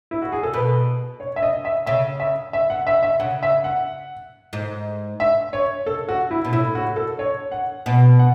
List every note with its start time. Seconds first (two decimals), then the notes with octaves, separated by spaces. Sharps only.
0.11 E4
0.22 F#4
0.32 G#4
0.43 A4
0.54 B2 B4
1.20 C#5
1.36 E5
1.43 D#5
1.65 E5
1.86 C#3 E5
2.20 E5
2.53 E5
2.70 F#5
2.87 E5
3.03 E5
3.20 C#3 F#5
3.43 E5
3.64 F#5
4.53 G#2
5.20 E5
5.53 C#5
5.86 A4
6.09 F#4
6.31 E4
6.45 B2
6.53 A2 E4
6.75 F#4
6.96 A4
7.19 C#5
7.52 F#5
7.86 B2 F#5
8.19 F#5